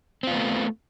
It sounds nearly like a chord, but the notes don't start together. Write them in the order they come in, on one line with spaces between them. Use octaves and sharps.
C4 F4 B3 A3